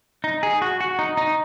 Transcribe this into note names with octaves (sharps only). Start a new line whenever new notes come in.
D#4
G#4
F#4
F#4
D#4
D#4